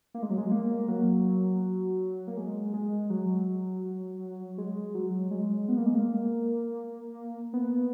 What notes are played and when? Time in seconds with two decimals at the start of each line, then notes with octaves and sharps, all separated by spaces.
0.14 A#3
0.23 G#3
0.30 F#3
0.38 G#3
0.51 A#3
0.88 F#3
2.27 A#3
2.37 G#3
2.73 G#3
3.10 F#3
4.58 G#3
4.94 F#3
5.31 G#3
5.68 B3
5.77 A#3
5.86 G#3
5.95 A#3
7.53 B3